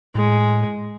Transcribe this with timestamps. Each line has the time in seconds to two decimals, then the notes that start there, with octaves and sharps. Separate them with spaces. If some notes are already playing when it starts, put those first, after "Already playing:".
0.15 A2 G#3